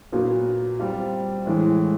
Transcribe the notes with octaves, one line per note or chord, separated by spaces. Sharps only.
A#2 F#3 B3
G3 C4 F4
A2 E3 G#3